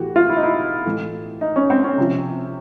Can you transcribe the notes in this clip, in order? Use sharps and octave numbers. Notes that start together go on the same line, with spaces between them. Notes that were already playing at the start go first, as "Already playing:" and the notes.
Already playing: A2 E3 F#4 G4
F4
E4
D#4
E4
A2 E3
D#4
C#4
C4
C#4
C3 F3